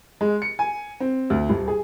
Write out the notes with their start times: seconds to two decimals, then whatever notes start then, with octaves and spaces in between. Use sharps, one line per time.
0.21 G#3
0.42 C#7
0.59 G#5
1.00 C4
1.30 D2
1.50 D#1
1.68 G#4